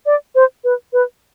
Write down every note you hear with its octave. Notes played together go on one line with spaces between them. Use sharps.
D5
C5
B4
B4